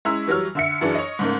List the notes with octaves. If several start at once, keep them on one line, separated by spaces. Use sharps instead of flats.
G#3 C#4 E4 A#5 E6
E3 F#3 G3 C#5 F6
D3 E5 C#7
F#2 E3 D4 G#4
C#5 D#5
G#2 C#3 A3 A#3